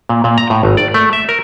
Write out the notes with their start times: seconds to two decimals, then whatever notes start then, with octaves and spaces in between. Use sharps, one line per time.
0.09 A#2
0.24 A#2
0.38 A#5
0.50 A2
0.63 G#1
0.77 D5
0.94 A3
1.13 E5
1.29 A#4